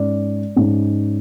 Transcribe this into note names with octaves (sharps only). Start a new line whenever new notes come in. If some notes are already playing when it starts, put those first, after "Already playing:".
Already playing: G#2 G#3 C#4 D5
G#2 G#3 C#4